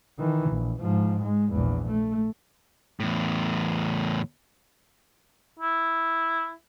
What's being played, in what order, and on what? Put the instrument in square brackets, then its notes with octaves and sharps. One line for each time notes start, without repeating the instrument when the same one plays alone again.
[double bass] D#3 E3
A#1
G#2 F3
G#3
A#1 E2
A3
[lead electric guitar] E2 A2
[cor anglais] E4